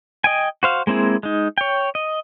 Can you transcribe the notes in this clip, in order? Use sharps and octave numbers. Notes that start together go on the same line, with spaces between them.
D#5 G5 G#5
F#4 C5 F5
G#3 A#3 C4 E4 G#4
G#3 D#4
C#5 G5
D#5